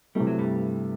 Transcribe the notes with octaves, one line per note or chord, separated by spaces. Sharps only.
C3 E3 G3 A3
F#3
G2 G3